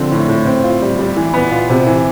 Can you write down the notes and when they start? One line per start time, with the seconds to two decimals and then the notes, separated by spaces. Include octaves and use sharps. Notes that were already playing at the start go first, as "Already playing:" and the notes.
Already playing: D3 F3 C4
0.11 A2
0.28 A2
0.46 C4
0.63 F4
0.82 G3
0.99 G3
1.17 E3
1.34 B3
1.52 F4
1.70 C3
1.87 E3